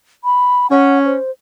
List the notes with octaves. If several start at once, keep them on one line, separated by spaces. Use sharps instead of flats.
B5
C#4 F#5
C5